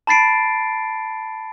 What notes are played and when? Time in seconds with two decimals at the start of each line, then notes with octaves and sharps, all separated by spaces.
0.07 A5 B5 A6 C7 D7